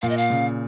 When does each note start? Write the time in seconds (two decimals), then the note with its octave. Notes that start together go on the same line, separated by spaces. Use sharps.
0.02 A#2 F5
0.10 D#5
0.17 F5
0.30 C#3